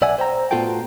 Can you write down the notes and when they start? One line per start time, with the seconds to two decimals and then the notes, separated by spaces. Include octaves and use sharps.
0.02 B1 D5 E5 F#5 G#5
0.18 C5 G5 A#5
0.51 A2 B3 F4 F#4 A4 G5